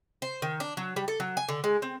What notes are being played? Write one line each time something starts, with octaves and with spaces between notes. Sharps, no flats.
C5
D#3
D4
F#3
G3
A4
F#3
G#5
D3
G#3
C4